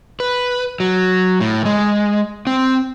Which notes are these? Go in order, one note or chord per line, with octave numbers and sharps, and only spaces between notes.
B4
F#3
A2
G#3
C4